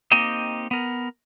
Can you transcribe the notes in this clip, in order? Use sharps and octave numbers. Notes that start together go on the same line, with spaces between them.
A#3 C4 D#4 G4 D#5
B3 A#4